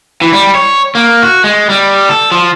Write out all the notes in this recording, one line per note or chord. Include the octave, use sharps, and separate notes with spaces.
E3
G3
C#5
A#3
F#4
G#3
G3
A4
F3